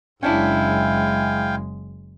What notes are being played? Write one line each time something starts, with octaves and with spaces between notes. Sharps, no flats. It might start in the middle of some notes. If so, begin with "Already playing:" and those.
F#1 G#3 C#4 D4 E4 F5 G5 G#5